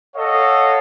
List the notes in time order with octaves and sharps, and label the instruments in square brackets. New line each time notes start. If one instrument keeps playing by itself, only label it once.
[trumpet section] A4 C#5 D#5 F5 F#5